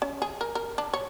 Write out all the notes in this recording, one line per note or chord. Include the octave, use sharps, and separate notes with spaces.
C#4
G#4
A#4
A#4
D4
C#5